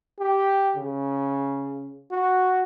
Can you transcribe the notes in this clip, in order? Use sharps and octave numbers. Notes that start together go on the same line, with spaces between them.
G4
C#3
F#4